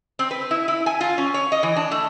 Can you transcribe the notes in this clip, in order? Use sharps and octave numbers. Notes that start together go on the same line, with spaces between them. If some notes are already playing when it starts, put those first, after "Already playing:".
C4
B4
E4
E4
G#5
F4
C#4
C#5
D#5
E3
D4
A3